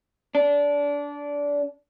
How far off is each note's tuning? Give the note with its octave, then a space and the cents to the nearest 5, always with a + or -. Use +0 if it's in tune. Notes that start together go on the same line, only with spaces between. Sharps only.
D4 -20